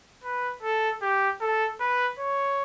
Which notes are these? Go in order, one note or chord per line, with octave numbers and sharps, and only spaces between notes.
B4
A4
G4
A4
B4
C#5